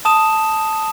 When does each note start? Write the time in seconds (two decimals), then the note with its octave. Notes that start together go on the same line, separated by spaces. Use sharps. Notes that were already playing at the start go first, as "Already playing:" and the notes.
0.05 A5 D#6 E7